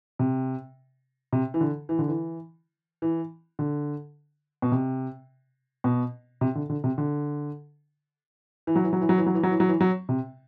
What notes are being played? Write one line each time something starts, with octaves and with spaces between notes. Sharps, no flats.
C3
C3
E3
D3
E3
D3
E3
E3
D3
B2
C3
B2
C3
D3
D3
C3
D3
E3
F#3
E3
F#3
E3
F#3
E3
F#3
E3
F#3
E3
F#3
E3
F#3
C3